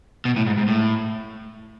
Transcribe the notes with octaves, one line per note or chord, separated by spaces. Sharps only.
B2
A2
G#2
G#2
A2